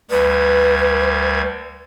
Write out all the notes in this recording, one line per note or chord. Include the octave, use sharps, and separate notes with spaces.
D2 G3 B4 G#6